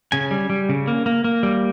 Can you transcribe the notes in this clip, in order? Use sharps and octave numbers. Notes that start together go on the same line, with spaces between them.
C#3 G#5
G3
G3
C#3
A#3
A#3
A#3
G3